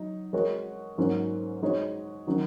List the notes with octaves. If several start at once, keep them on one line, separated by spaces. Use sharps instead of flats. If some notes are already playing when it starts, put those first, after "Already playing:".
Already playing: F#3 D#4
G#3 F#4 A#4 C#5
G#2 F#3 A#3 C#4
G#3 D#4 F#4 C#5
D#3 F#3 C#4